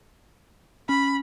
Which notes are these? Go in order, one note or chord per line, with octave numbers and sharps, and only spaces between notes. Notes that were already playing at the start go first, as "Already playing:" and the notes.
C#4 B5